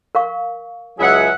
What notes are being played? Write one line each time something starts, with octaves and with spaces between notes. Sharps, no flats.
A#4 F5 C#6
C#2 F#3 G#4 E5 F#5